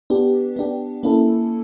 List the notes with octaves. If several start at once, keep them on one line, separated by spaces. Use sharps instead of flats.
B3 D4 G4
B3 D4 G4
A#3 C#4 E4 A4